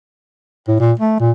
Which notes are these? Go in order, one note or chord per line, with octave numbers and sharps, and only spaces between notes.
A2
A#2
A3
A#2